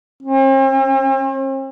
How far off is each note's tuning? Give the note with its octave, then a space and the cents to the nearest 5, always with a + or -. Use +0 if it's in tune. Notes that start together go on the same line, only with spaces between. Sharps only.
C4 +45